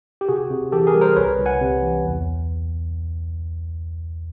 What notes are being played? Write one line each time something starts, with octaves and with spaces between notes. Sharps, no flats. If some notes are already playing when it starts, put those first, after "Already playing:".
G4
C3 F#4 G#4
C3
E3 G4 A4
G#4 A#4
G3
A#4 C5
C2 B4 C#5
C2
F#5 G#5
C3
E3
E2